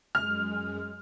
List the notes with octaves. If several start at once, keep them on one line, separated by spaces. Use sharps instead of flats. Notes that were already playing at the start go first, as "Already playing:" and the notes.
F#2 G#3 F6